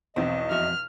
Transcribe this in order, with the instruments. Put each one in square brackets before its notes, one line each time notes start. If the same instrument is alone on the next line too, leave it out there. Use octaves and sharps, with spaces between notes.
[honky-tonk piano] B1 E2 [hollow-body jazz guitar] C4 [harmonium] D#5
[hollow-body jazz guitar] F2 F#4 E5 [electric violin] F6